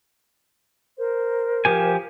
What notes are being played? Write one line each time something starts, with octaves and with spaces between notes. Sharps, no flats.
A#4 C5
F3 G4 G#5